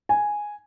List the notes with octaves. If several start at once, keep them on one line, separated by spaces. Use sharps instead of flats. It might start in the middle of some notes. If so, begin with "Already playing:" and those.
G#5